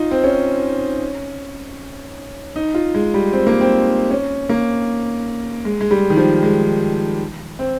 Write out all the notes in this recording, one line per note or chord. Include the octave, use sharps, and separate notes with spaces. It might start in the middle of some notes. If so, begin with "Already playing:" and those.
Already playing: D#4 F4
C4
C#4
D#4
F4
G#3
G3
C4
A#3
C4
C#4
A#3
G#3
G#3
G3
D#3
F3
G#3
C4